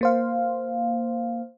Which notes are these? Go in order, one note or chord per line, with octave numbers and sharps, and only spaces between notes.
A#3 C5 F5